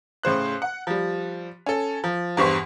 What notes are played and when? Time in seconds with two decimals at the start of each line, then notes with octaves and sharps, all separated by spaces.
0.23 A2 C#3 C5 F#6
0.62 F#5
0.87 F3 G3
1.66 C#4 A4
2.04 F3
2.37 E2 G2 C5 C#6 B6